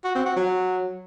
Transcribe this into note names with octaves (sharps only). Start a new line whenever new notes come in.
F#4
C4
F#4
F#3